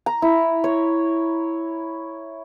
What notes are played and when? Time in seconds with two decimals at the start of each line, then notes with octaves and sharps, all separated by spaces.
0.06 A#5
0.22 E4
0.64 C#5